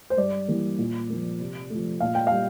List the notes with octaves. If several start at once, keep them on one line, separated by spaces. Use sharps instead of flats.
C5
G2 D5
E3 G3 A#3
A#2
F3 A#3
C3
F3 A3
A#2 F5
G5
G3 F5